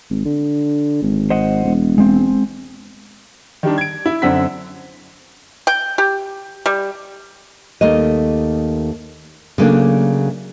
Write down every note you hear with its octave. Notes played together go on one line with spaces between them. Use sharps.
G#1
D3
G#1
C5 D#5 F#5
E1
G#3 C4
D#3 G3 D4
G#6 D7
E4
F#2 D3 C4 F#5 E6 B6
G5
G4
G3
D#2 A3 A#4 D#5
C#3 F#3 A3 A#3 C4 D4